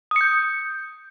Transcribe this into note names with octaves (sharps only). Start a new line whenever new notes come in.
D#6 G6 C#7